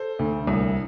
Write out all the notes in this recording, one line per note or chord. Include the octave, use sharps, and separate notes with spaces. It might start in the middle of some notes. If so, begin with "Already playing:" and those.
Already playing: A4 C5
D2
C2